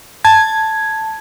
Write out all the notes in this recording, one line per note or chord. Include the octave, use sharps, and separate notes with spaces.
A5 G#6